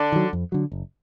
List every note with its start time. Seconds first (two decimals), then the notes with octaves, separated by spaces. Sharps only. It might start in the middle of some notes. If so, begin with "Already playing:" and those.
Already playing: D3 D4
0.12 D#3 F#3
0.33 F2
0.52 D3 F#3
0.72 F#1